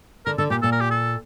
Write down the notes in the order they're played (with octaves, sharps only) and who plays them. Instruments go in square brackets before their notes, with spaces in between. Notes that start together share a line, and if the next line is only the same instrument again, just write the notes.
[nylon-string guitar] D3 [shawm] A#4
[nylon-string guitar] D3 [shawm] A4
[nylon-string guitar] A#2 [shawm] G4
[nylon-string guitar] A#2 [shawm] A4
[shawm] A#4
G4
A4